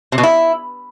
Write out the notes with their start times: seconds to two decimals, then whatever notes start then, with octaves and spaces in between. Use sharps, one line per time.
0.12 C3
0.18 B2
0.23 E4